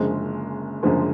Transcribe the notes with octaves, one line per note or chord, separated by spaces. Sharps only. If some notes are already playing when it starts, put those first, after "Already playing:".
Already playing: F#1 F#2 D3 F3 G#3
F#1 F#2 D3 F3 G#3